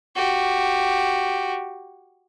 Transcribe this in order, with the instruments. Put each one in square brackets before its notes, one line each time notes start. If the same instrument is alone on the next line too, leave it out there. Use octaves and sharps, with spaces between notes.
[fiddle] F#4 G4